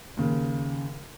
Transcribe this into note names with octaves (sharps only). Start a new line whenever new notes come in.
D#2 C#3